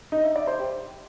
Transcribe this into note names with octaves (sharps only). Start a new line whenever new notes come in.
D#4
E5
D5
C5
G4